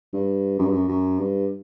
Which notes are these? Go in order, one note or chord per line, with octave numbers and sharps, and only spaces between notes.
G2
F#2
G2
F#2
F#2
G2